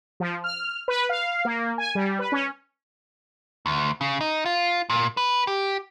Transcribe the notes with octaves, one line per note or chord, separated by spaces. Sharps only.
F3
F6
B4
F5
A#3
G#5
G3
B4
C#4
D2
C#3
D#4
F4
A#2
B4
G4